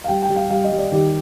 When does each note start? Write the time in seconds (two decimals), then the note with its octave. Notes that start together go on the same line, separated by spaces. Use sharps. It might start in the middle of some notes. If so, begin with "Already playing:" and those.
0.04 F5
0.08 G3 G5
0.22 G5
0.29 G3
0.36 F5
0.50 G3 F5
0.64 D#5
0.71 G3
0.78 D5
0.92 D#3 G4